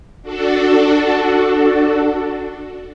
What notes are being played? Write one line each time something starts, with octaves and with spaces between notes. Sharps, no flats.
D4 F#4 A4